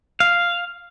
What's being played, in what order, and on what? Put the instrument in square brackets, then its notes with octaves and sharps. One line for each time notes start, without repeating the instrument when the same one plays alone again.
[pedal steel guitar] F5